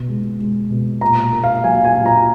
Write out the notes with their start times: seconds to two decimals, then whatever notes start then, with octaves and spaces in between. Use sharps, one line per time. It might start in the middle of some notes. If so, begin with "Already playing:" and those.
Already playing: B2
0.08 G#3
0.39 G#3
0.70 B2
1.01 A#2 A#5
1.33 A#3
1.44 F5
1.64 F#3 G#5
1.85 G#5
1.94 A#2
2.06 A#5